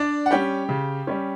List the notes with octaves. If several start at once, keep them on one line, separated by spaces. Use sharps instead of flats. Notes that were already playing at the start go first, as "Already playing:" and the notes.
Already playing: D4 D5
F#5
G3 C#4 G4 G5
C#3
G3 C#4